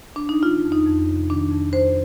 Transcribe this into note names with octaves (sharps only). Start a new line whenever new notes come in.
D4
D#4
D#3 F4
F2
D#4
F2
C3
D#3 D4
F2
F2 C5